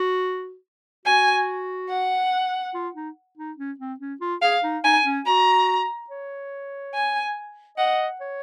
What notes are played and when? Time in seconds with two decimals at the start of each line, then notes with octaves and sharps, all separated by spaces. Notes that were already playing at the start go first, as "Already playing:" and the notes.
Already playing: F#4
1.06 F#4 G#5
1.90 F#5
2.74 F4
2.95 D#4
3.38 D#4
3.57 C#4
3.79 C4
4.00 C#4
4.21 F4
4.42 G#4 F5
4.63 D#4
4.84 D#4 G#5
5.05 C#4
5.26 F#4 A#5
6.10 C#5
6.94 G#5
7.78 D#5 F#5
8.21 C#5